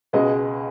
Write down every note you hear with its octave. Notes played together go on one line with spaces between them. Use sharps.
C#2 B2 G#3 D#5